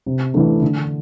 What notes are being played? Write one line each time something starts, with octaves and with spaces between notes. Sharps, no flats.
C3
E3 A3 D4
D3